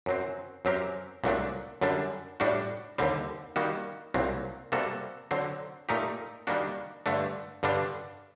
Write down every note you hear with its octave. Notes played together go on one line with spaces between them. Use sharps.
F#2 F#3 C4
F#2 F#3 C4 G4 A#4
C2 A#2 F#3 A3 D4
F#2 D3 G3 D4
A2 G3 D4 F#4
D#2 D3 G3 C4
D#3 G3 A#3 F#4
C2 A#2 F#3 C4
C3 G3 A#3 F#4 A4
D3 F#3 C4
A#2 A3 D#4 G4 A#4
D#3 G3 A#3 D4 F#4
G2 D3 A3 D4
G2 D3 G3 D4